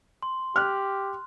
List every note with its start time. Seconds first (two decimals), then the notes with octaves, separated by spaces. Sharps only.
0.23 C6
0.56 G4 F6 F#6